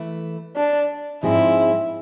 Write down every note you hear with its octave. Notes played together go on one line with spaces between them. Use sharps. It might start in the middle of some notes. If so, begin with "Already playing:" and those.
Already playing: E3 A3 E4
D4
G#2 F3 G#3 C4 E4